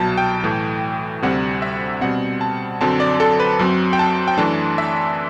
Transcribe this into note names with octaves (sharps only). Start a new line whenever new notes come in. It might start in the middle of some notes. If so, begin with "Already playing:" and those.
Already playing: C2 B2 F#3 A5
G5
A2 E3 A3
D2 C3 G3 C4 F#5
E5
B2 G3 C4 F#5
A5
F#2 D3 F#3 C4 A5
D5
A4
B4
F#2 F#3 C4
G5
A5
G5
F#2 E3 A3 D4 A5
E5